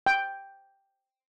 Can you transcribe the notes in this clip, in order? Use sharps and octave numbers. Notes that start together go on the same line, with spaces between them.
G5